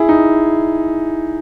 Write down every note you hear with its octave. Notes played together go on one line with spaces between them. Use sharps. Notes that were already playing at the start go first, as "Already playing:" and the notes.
Already playing: E4 G#4
D#4